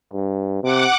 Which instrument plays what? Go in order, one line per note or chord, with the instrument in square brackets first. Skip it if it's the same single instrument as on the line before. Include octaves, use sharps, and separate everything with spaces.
[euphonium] G2
[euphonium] C3 [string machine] F#5 D6